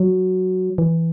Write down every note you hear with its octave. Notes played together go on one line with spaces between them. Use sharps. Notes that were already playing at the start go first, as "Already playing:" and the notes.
Already playing: F#3
E3